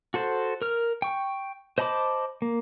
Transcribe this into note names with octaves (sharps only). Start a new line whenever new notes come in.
F#4 A4 C5
A#4 F6
G5 C#6
C5 D#5 A5 B5 D6
A#3